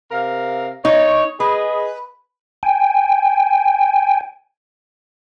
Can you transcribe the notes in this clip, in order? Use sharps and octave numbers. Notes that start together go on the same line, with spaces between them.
C3 A#4 F5
D#4 C#5
G#4 B4 D#5
G5 G#5